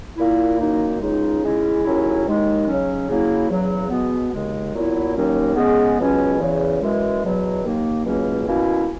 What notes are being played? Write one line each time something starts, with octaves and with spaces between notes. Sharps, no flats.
A#2 A#3 E4
F#2 D#3 A#3 D#4
C#2 C#3 G#3 D#4
C#3 G#3 C#4 E4
D#2 C#3 F#3 C#4 E4
D#2 D#3 G#3
C#3 F#3 C#4
C#3 F#3 A#3 E4
E2 C#3 F#3
B2 G#3 B3
D#2 C#3 G#3
A#2 F#3 B3 E4
D#2 D#3 F#3 A#3 C#4
C#3 G#3 B3
C#2 B2 F#3 C#4
E2 C#3 E3
F#2 E3 G#3
E2 B2 F#3
D#2 D#3 A#3
C#2 B2 F#3 A#3 C#4
B2 A#3 C#4 E4